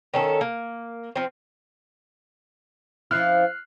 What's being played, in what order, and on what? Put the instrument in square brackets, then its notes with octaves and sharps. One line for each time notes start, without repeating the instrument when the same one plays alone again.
[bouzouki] D#3 C#4 A4
A#3
F3 C4
[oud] F3 C#4 E4 [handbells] F6 F#6 C7